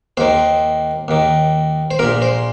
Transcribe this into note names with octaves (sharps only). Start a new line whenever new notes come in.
D#2 D#3 C5
D#2 D#3
C5
A#1 A#2 A#4
C5